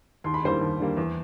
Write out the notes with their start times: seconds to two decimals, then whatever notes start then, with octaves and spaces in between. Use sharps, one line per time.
0.24 D#2 C6
0.34 B5
0.43 D3 G3 A#3 C5 C6
0.61 D#2
0.79 D3 G3 A#3
0.97 E2